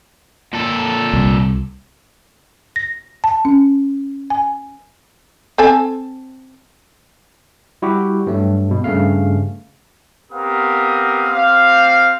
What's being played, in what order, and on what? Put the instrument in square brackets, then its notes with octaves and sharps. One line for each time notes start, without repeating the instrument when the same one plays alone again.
[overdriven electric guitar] A#2 A4
[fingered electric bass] C2
[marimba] A#6
A5
C#4
G#5
[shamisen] C4 A4 G#5
[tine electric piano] G3 E4 F#4 G4
G2 F#3 A3
B2
G2 C#3 A3 F5
[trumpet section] B3 C4 G4 A#4 F5 D#6
C4 G4 C5 F5